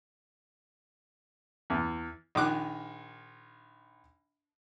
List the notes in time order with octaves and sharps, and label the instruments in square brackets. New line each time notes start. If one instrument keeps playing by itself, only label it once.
[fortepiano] E2
A#1 D#3 D6 F#6